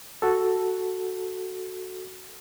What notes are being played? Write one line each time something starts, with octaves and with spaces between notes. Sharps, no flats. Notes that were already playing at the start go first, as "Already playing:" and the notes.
F#4 A4